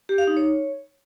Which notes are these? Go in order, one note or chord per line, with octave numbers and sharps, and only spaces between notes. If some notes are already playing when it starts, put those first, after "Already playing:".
G4
F5
D#4
C#5